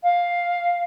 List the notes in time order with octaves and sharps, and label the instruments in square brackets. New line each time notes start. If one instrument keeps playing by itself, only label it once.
[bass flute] F5